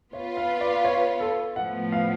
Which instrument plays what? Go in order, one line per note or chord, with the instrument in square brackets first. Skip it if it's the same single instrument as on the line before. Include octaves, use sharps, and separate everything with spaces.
[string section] B3 F4 B4 [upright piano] C#5
[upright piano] F5
D5
C#5
A4
[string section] A2 F3 B3 [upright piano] F#5
[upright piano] F5